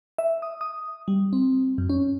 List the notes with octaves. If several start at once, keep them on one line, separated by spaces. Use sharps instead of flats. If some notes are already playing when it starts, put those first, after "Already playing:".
E5
D#6
D#6
G3
C4
F#2
C#4